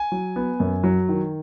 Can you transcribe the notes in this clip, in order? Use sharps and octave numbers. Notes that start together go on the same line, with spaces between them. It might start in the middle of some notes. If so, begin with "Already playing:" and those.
Already playing: G#5
F#3
B3
F#2
F#3
D#3